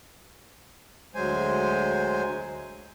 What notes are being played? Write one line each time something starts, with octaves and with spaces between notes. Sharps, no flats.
D2 F#3 G#3 C5 G#5